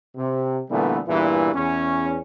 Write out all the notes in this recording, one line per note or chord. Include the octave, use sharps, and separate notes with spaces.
C3
A#2 D3 E3 G3 A3 B3
E2 G2 A#2 E3
E2 C#4